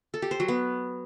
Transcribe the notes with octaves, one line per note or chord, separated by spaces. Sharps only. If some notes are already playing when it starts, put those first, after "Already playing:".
A4
G4
C5
F#3
B3